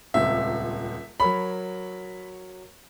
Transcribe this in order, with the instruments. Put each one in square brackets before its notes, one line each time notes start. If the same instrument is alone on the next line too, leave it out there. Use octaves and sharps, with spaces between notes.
[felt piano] D#1 C#2 C4 [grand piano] E5
[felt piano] F#3 A#4 C#5 [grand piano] B5